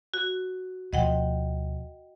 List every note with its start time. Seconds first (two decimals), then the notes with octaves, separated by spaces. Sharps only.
0.14 F#4
0.93 D2 B2 F3 D#5 F#5 G5